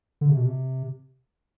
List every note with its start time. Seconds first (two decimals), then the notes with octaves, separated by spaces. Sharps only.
0.21 D3
0.29 C3
0.37 B2
0.45 C3